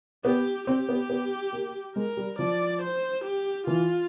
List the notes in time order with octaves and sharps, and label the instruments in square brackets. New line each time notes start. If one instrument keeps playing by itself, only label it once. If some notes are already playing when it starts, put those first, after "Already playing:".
[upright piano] B3 [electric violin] G4
[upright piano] C4 [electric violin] G4
[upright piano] B3
B3
A#3
[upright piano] G#3 [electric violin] A#4
[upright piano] G3
[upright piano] F3 [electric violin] D5
[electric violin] C5
G4
[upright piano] E3 [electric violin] F4